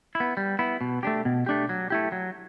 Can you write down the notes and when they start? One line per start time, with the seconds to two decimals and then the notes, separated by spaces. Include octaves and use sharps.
0.15 E4
0.20 B3
0.37 G3
0.59 B3 E4
0.81 B2
1.03 A3 D4 G4
1.25 B2
1.46 A3 D4 G4
1.69 F#3
1.90 A3 E4 G4
2.12 F#3